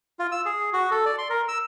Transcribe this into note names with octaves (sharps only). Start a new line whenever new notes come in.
F4
E6
G#4
F#4
A4
D5
C6
A#4
E6